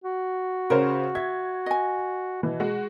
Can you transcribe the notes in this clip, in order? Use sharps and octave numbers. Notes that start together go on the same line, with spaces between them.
F#4
C#3 C#4 A#4 C5
E5 G#6
D#5 G#5
B2 E3
G#3 F#4